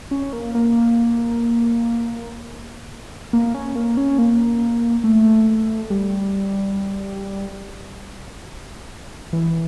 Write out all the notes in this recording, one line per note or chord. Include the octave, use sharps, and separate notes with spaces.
C#4
A#3
A#3
A#3
C#4
A#3
C#4
A#3
A3
G3
E3